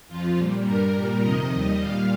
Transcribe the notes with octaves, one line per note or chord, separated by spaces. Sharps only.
F2 F3 F4
A#2 G3
G2 G3 A#4
A#2 G3
F2 C3 D#3 D#5
D#2 D#3 G3
A#2 G3 F5